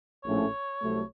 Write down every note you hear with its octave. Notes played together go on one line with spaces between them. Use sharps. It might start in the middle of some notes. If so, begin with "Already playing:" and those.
A#1 A2 F3 A3 C#4 C#5
C2 C3 F#3 A3